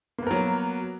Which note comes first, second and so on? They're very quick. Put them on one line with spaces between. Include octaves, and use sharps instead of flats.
A#3 B3 A#4 F#3